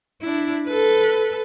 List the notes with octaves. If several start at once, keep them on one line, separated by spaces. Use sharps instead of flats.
D4 E4
A4 B4